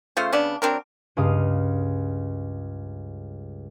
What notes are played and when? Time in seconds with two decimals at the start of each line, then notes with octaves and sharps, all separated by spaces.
0.17 C#3 A3 F4 C5
0.32 C#3 B3 D4
0.62 F#3 C4 D4 A#4
1.17 C#2 G2 F5 D#6